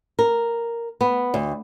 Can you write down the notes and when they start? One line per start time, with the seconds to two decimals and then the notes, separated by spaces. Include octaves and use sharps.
0.19 A#4
1.01 B3
1.34 D2